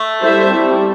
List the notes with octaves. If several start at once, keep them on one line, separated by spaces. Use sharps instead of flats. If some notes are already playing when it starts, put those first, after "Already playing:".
Already playing: A3
G3 E4 A4 C5 E5
G3 C4 E4